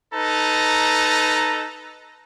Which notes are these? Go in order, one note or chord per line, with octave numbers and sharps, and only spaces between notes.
D#4 A4 B4 A#5